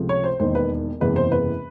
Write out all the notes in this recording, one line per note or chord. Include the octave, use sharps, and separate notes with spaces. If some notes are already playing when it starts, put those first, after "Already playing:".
Already playing: C#2 C3 F3 A3
C#5
C5
E1 D#2 D#3 C5
B4
F#1 E2 C3 E3 G#3 B4
C5
B4